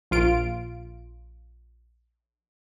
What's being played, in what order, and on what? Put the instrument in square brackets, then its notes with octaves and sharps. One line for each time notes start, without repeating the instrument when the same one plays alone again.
[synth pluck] A#1 F4 D7